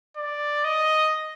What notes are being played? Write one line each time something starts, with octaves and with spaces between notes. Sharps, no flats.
D5
D#5